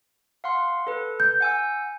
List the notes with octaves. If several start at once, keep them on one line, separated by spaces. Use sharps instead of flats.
F5 F#5 C6
A4 B4
G6
F#5 G#5 E6